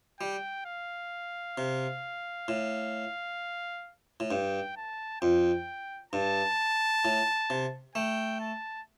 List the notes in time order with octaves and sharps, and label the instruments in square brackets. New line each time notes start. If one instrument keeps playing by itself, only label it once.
[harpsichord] G3 [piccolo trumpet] G5
[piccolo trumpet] F5
[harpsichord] C3
A2
A2
[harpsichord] G2 [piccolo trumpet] G5
[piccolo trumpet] A5
[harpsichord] F2 [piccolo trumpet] G5
[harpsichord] G2 [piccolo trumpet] A5
[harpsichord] A2
C3
[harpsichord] A3 [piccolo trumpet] G5
[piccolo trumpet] A5